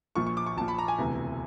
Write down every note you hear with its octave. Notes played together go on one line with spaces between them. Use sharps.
A#1 A#2 F3 C#6
C#6
D6
C#6
A#1 A#2 F3 A5
B5
A#5
G#5
E1 D2 C3 E3